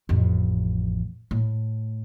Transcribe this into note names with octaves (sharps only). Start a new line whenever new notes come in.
A1 F2
A2